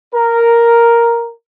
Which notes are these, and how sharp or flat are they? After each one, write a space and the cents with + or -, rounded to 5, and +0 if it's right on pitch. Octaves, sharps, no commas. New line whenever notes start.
A#4 +0